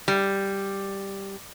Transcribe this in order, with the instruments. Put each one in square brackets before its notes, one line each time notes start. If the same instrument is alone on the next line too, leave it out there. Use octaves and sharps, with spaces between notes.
[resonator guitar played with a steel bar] G3